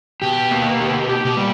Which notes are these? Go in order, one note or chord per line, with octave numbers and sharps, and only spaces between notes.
B2 G4
A#3
G4
G4
B2
A#2 G3